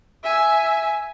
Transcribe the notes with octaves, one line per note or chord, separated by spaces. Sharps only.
E5 G#5